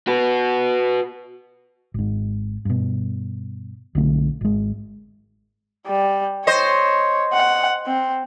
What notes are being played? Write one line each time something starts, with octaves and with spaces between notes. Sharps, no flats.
F#4 B4
G#1 G#2
G2 B2
B1 D3 A3
G#1 G#3
G3
C5 C#5 D#5
F#5
C4